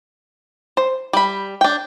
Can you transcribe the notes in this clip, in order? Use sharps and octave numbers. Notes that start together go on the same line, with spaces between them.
C5
G3 B5
D4 G5